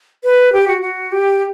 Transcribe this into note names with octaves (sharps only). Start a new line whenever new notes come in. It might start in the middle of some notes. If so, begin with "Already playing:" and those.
B4
G4
F#4
F#4
G4